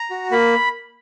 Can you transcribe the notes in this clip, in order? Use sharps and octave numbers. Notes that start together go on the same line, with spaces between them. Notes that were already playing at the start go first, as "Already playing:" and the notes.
Already playing: A#5
F#4
A#3 B5